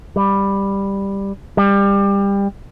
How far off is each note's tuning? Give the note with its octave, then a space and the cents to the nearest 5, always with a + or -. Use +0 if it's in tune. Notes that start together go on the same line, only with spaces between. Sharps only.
G3 +10
G3 +25